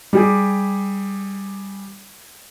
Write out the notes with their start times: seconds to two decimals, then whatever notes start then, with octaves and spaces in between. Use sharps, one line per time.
0.13 G3 G4 G#4